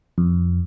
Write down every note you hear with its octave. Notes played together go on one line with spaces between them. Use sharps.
F2